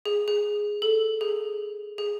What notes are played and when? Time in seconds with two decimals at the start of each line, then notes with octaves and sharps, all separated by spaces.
0.06 G#4
0.28 G#4
0.82 A4
1.21 G#4
1.98 G#4